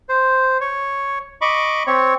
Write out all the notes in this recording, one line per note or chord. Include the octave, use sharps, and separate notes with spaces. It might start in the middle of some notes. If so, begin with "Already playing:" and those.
C5
C#5
D#5 B5 C#6 D6
C4 C#5